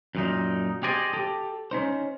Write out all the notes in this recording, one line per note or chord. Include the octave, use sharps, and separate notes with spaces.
F#2 A#2 D#4
G4 G#4 C5 D5 D#5 G#5
G4 A4
C#4 D#4 C5